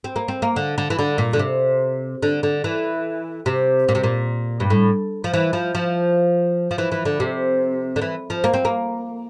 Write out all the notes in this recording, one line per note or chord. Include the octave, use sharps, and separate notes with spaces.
C4
A#3
C4
A#3
D3
D3
E3
D3
A#2
D3
C3
D3
D3
E3
C3
A#2
C3
A#2
G2
A2
F3
E3
F3
F3
F3
E3
E3
D3
C3
D3
E3
F3
A#3
C4
A#3